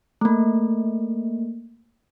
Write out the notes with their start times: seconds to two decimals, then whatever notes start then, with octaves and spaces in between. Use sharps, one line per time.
0.21 A3 A#3